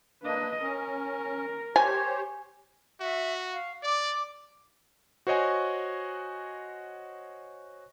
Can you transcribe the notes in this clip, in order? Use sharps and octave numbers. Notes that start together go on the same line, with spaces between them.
A#3 D4 B4 D#5
C#4 A#4
G4 C5 C#5 G#5
F#4 E5
F5
D5 D6
F#4 C5 C#5 D#5 F#5 G#5